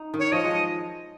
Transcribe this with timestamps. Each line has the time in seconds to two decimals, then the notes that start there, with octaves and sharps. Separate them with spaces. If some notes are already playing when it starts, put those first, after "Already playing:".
Already playing: D#4
0.14 D#3
0.19 C#5
0.32 F3 D#5
0.44 G#3